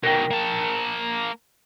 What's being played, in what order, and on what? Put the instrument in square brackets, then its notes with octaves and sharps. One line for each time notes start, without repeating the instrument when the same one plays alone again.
[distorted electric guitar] B2 D#3 [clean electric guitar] A#4 G5
[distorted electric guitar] A#3 A5